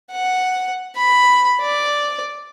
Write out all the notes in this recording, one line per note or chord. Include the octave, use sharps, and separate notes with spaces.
F#5
B5
D5